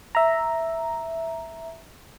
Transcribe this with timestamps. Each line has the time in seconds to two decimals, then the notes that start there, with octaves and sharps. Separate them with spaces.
0.15 E5 A#5